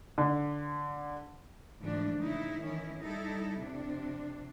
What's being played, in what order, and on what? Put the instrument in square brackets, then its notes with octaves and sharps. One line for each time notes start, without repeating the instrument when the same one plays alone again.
[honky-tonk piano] D3
[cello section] G#2 D3 E3 F3 A3 D4
C#3 D#4 E4
D#3 E3 C#4 E4
G3 D#4 E4 A4
F2 C3 D4